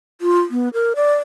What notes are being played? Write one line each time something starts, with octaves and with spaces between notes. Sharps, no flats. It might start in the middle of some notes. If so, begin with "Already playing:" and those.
F4
B3
A#4
D5